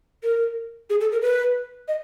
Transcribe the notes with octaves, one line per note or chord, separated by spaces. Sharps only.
A#4
G#4
A4
A#4
B4
D#5